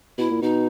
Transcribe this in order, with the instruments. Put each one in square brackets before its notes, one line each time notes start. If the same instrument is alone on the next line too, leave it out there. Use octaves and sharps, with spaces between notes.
[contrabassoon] B2 [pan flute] E4
[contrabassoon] A#2
[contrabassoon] B2 [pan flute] D#4